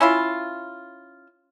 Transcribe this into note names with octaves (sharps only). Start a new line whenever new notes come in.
C#4 E4 F4